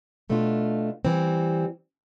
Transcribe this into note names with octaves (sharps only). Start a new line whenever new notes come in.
B2 A3 D4 F4
E3 G3 C4